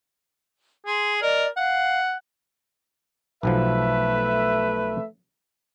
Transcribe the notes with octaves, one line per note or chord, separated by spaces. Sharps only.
G#4 C6
A#4 D5 D#5
F5 F#5
B1 B2 F3 A3 B4 E5